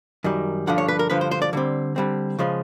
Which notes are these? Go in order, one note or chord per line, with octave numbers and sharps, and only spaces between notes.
F#2 D#3 G3
G2 D3 F3 F#5
C#5
B4
A#4
G2 D3 F3 B4
C5
C5
D5
D3 G3 C4
D3 G3 C4
C#3 F3 G#3 C#4